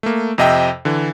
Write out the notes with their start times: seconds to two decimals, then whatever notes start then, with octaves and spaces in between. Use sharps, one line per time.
0.03 A3 A#3
0.38 F2 C3 D#5 E5 G5 E6
0.85 D3 E3